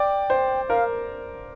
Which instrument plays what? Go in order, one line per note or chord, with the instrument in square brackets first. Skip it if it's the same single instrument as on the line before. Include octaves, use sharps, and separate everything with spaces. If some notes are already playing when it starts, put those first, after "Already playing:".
Already playing: [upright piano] D5 [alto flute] G5
[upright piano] C5
[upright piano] A#4 [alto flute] F5